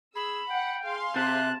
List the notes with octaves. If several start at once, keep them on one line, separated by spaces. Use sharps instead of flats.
G#4 B5 E6
F#5 G5
G#4 F5 C6
C3 A5 F#6